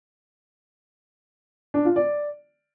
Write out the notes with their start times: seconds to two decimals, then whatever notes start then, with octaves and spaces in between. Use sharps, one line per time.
1.74 D4
1.85 F4
1.96 D5